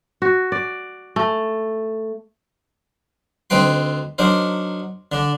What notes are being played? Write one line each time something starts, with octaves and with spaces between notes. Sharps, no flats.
F#4
D5
A3
D2 C4 D#4 B4 G5 C6
F#3 D4 D#4 A#4 C5
D3 D4